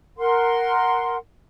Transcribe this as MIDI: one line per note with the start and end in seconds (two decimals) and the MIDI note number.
0.17 1.15 70
0.17 1.15 78
0.17 1.15 84